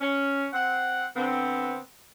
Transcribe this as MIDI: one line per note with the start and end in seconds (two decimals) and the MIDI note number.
0.01 0.47 61
0.53 1.05 60
0.53 1.05 78
1.16 1.78 50
1.16 1.78 59
1.16 1.78 60